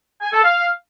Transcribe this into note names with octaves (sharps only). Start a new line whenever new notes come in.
G#5
A4
F5